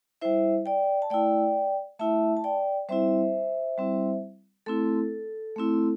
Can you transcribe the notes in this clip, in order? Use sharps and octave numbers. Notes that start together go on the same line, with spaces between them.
G3 E4 C5 E5
D5 G5
A5
A3 E4 D5 G5
A3 E4 E5 A5
A5
D5 G5
G3 C4 E4 C5 E5
G3 C4 E4
A3 C4 E4 A4
A3 C4 E4